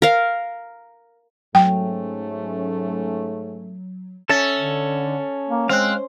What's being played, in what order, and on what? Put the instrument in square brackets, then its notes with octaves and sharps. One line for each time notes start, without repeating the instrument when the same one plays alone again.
[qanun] A#4 F5
[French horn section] G#2 A3 C#4 [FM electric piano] F#3 [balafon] G5
[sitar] C#4 [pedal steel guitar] A4 E5 A5
[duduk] D3
A#3
[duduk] G#3 [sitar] C4 [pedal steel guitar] F5 F#6